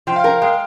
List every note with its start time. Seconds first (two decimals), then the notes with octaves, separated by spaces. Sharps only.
0.07 F3 G5
0.16 F5
0.24 A#4 G5
0.42 G#3 G5